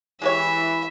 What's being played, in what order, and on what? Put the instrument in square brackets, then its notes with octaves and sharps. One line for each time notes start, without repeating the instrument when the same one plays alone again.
[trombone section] E3 [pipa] G#3 G4 C#5 [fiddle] E5